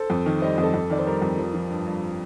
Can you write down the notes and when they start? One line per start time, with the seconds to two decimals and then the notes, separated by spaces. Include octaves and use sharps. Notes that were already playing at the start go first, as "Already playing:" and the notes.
Already playing: A4 C5
0.10 F2
0.26 D#3
0.42 G3 C5 D#5
0.58 F2
0.63 A4
0.74 F2
0.90 D#3 D5
0.99 C5
1.06 G3 A#4
1.22 F2
1.38 F3
1.54 F3
1.70 G2
1.86 G2